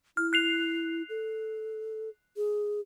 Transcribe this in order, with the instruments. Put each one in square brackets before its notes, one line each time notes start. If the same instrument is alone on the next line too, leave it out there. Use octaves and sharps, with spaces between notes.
[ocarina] E4 [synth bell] F6
[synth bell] F#6 C7 F7
[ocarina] A4
G#4